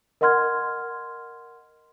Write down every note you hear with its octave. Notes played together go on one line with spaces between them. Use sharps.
A#4 D#5 F#5 C6 F6 G#6